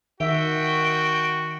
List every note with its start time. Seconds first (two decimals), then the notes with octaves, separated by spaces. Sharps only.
0.20 D#3 F#4 E5 G5